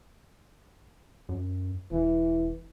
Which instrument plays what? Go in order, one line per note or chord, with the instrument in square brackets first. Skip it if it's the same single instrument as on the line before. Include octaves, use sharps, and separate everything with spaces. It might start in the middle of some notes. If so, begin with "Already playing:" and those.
[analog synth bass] F#2
[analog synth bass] E1 [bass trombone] E3